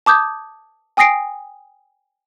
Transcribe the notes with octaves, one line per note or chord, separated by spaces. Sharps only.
A5 D6 D#6 G6 G#6
G5 G#5 D#6 A#6 C7 D7